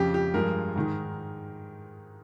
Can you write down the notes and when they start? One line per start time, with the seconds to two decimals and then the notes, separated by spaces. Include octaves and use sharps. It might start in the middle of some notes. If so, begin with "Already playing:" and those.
Already playing: F2 C#3 F3 G4
0.14 G4
0.34 G2 F3 G#3 A#4
0.76 G#2 D#3 G#3